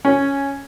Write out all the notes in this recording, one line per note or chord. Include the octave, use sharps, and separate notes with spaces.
C#4